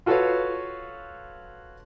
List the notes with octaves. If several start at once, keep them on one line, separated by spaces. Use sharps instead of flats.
F4 F#4 A4 B4 C#5 F5